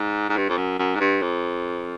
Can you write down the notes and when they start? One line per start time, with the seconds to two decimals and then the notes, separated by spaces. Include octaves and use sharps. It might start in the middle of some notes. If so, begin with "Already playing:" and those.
Already playing: G#2
0.29 G#2
0.37 G2
0.49 F2
0.57 F#2
0.79 F#2
0.95 G#2
1.00 G2
1.22 F2